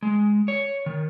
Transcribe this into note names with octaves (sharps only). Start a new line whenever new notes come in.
G#3
C#5
D#3